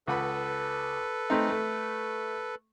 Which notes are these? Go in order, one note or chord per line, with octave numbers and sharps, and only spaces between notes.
C#2 A4 B4 F#5 B5
A3 C4 D#4
A3